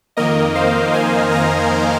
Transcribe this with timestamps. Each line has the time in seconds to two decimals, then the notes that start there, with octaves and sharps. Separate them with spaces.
0.17 F2 D#3 A#3 A#4 D#5
0.55 C5 F5
0.93 D#5 G#5
1.32 F5 A#5